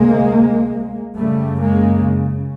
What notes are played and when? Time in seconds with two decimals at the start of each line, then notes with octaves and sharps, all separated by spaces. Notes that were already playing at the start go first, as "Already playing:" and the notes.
Already playing: D2 C3 G#3 A#3
1.16 F#2 C#3 G3 A3
1.61 G#3 A#3